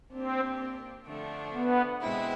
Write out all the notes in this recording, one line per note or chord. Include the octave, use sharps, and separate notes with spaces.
A#3 C4 D4 G4
D3 F3 A3 D4
B3
B2 G#3 C4 E4